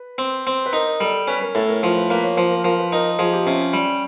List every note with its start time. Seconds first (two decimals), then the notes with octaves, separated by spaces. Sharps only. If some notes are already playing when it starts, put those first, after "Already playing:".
Already playing: B4
0.18 C4
0.47 C4
0.66 B4
0.73 D#4 A#4
1.00 G3 A4
1.28 C#4 B4
1.42 A#4
1.55 A2 A4
1.69 A#4
1.83 F3 A#4
1.96 B4
2.10 A#3 B4
2.23 C#5
2.37 F3 C5
2.51 A#4
2.64 F3 A#4
2.79 B4
2.92 D#4 A#4
3.19 F3 G#4
3.33 G4
3.46 C3 C#4
3.73 G3